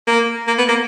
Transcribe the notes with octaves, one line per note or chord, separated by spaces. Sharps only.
A#3
A#3
B3
A#3